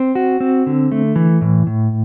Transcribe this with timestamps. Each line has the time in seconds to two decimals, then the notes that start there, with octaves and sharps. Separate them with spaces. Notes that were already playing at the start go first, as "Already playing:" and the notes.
Already playing: C4
0.15 F#4
0.40 C4
0.66 D3
0.92 A3
1.16 E3
1.41 A2
1.67 A2